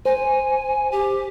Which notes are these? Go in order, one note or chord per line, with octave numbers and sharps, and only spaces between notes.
C5 G#5
G4